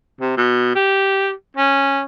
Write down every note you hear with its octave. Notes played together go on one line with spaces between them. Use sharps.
C3
B2
G4
C#4